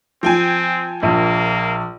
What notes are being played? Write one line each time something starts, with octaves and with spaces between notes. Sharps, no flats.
F3 C4 G5 G#5
A#1 A#3